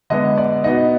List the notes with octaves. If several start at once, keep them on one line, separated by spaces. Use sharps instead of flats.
D3 G#3 B3 D#5
D5
B2 B3 D#4 D#5